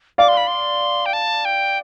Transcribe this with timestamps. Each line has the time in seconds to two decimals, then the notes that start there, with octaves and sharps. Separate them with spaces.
0.18 D5 F5 D6
0.28 C6
0.37 B5
0.47 C6
1.06 G5
1.13 A5
1.45 G5